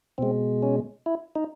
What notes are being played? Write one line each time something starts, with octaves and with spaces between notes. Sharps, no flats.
B2 G#3 C4
C#4
E4
D#4